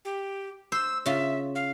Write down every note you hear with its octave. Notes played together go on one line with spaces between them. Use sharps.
G4
C5 E6
C#3 F4 E5
F5